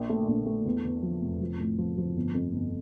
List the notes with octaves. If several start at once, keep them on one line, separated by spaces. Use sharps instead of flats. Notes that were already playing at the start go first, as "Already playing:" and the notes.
Already playing: A#1 A#2
A3
A#1
A3
E2
E2
F3
F1
F3
A2
F3
F3
G1
F2
G1